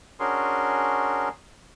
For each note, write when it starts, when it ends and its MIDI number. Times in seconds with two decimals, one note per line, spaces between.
0.20 1.29 61
0.20 1.29 62
0.20 1.29 66
0.20 1.29 68
0.20 1.29 70
0.20 1.29 84